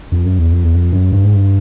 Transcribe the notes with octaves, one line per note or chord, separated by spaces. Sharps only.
F2
F#2
E2
F2
E2
F2
F#2
G2
G#2
G2